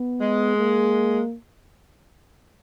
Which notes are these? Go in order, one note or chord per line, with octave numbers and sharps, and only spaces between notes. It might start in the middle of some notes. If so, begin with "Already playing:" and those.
Already playing: B3
G#3
A#3